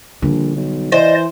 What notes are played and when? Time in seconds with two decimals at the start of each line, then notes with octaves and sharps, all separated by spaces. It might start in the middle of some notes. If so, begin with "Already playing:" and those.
0.22 A#1 D3 G3
0.56 B1
0.92 E3 C5 D5 D#5